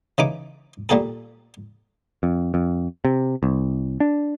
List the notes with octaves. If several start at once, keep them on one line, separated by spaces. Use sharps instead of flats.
C#3 E3 D#4 D6
A#2 G3 A#3 G#4 A4
F2
F2
C3
C2
D4